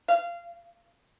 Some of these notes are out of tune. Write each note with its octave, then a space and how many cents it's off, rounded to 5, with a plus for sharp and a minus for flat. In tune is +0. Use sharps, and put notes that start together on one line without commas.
F5 -20